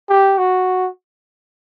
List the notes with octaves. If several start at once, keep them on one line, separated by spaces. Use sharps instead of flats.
G4
F#4